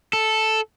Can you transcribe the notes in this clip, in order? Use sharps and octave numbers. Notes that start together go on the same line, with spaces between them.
A4